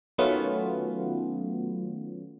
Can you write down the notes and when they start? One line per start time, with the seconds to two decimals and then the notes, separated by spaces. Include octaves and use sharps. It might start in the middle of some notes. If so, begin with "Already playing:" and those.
0.18 D#3 F#3 A3 B3 C#4 F4